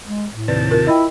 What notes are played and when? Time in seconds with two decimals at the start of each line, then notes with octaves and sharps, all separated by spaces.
0.06 G#3
0.32 A2
0.48 D#2 C3 B4 D5 A5
0.71 F4 A#4
0.87 E4 D#5 G5